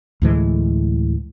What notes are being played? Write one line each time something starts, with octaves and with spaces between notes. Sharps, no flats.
D2 A2 E3 G#3